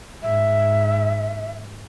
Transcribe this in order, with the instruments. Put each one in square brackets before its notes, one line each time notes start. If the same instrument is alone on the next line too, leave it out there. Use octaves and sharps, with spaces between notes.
[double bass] G#2 [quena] E5